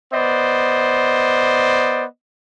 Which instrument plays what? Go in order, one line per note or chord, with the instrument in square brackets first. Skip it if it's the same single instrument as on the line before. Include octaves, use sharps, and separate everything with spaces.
[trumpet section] B3 C5 D5 D#5